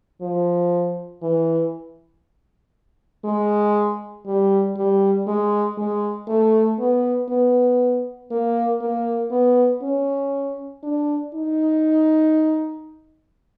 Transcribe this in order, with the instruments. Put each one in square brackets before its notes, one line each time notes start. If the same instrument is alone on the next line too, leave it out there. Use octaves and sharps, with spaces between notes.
[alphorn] F3
E3
G#3
G3
G3
G#3
G#3
A3
B3
B3
A#3
A#3
B3
C#4
D4
D#4